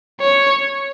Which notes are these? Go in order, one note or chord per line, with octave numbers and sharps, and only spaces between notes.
C#5